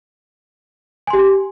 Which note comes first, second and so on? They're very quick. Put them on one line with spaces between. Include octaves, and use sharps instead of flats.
G#5 C6 G4